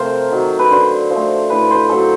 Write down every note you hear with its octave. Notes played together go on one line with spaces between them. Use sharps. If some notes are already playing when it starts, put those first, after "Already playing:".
Already playing: C3 F3 A3 A#4 C5
D#3 F#3
B4
D3 C5
F3
A3
A2 B4
C5
F#3 A3 A4